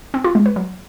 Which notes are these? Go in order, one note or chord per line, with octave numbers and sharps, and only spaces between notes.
C4
F4
G#3
B4
F#3